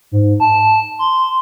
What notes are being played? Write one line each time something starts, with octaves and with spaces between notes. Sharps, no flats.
G#2
A5
C6